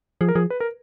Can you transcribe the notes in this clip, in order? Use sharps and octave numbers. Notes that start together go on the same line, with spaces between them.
F3 G#4
A#4
F3 G#4
B4
A#4